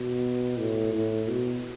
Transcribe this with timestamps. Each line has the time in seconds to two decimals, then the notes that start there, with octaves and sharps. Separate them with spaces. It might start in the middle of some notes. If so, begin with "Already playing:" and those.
Already playing: B2
0.59 A2
0.94 A2
1.28 B2